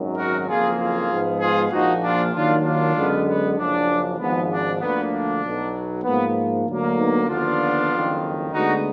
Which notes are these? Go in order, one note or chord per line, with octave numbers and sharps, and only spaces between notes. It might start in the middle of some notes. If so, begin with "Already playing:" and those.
Already playing: G#1 F#2 D#3 F#3
F#4 A#4
F#1 F2 F3 A#3 F4 G#4
F4 G#4
G#2 F3 G#3 B3
F4 G#4
A#1 A#2 F3 D#4 F#4
D4 F4
D#2 D#3 F#3 A#3 D4 F4
D4 F4
F#2 D3 G#3 B3
B3
F#1 F#2 F3 D4
G#1 G#2 F3 B3
D4
D2 D3 F3 A#3 B3
D4
B1 B2 F#3
G#2 F3 A#3 B3
D2 D3 F#3 A#3
B3 D#4
D#2 D3 F3 B3 D4 F4
F#1 F2 D#3
D2 D3 G#3 B3 D#4 F#4